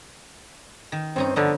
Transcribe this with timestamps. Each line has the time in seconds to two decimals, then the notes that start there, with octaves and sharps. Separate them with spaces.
0.92 D#3
1.16 G2 C4 C#4 D#4
1.36 D3 F3 B3 D#4